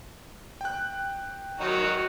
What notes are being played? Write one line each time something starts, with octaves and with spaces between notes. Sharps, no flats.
G5 F#6
D#3 F#3 D#4 F#4